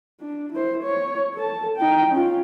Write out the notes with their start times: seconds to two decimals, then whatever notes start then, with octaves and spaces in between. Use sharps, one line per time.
0.21 D4
0.53 E4 C5
0.83 C#5
1.35 A4 A5
1.77 D#4 G5
2.12 C#4 F4